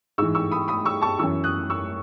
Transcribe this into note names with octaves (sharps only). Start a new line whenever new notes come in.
G#2 E3 C#6 E6
C#6 E6
B5 D#6
B5 D#6
C#6 E6
A5 C#6
F#2 E3 C#6 E6
D#6 F#6
C#6 E6